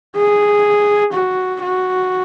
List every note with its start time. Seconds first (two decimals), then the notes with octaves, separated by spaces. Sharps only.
0.16 G#4
1.13 F#4
1.62 F#4